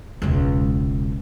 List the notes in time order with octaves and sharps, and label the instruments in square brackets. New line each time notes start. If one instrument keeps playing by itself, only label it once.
[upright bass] E1 C#2